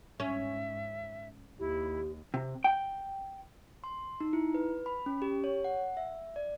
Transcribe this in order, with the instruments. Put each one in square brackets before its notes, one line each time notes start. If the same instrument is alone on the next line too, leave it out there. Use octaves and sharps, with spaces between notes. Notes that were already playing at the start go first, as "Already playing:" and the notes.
[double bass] G#2 [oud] C#4 [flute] E5
[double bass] D#2 [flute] E4 [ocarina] G4
[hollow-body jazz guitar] C3
G5
[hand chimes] C6
D#4
E4
B4
B5
C#4
G4
C#5
F#5
E5
D5